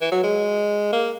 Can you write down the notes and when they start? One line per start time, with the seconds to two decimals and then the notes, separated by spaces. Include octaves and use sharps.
0.01 E3
0.12 F#3
0.23 G#3
0.93 A#3